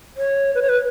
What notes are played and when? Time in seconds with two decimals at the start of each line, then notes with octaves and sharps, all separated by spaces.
0.17 C#5
0.55 B4
0.62 C#5
0.69 B4